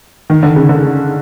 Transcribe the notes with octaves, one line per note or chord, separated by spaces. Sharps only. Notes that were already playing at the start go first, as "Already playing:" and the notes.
D#3
D3
C#3
D3